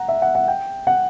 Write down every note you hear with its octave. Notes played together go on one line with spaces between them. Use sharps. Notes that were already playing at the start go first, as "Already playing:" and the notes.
Already playing: F#5 A#5
E5
F#5
F#5
G5
F#5